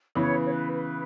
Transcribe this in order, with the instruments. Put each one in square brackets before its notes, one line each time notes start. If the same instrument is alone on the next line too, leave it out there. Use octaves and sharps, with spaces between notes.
[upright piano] C#3 E3 B3 [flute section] C#5
[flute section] C#5
B4
B4